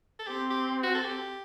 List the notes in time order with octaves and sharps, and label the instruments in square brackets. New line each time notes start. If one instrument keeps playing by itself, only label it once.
[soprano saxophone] A4
[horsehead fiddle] C4 [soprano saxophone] G4
[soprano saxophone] G4
F#4
A4
G4